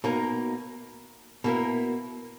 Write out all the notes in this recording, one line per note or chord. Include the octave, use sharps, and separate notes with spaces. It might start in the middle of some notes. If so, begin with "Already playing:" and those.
B2 A#3 D#4 A#4
B2 A#3 E4 A#4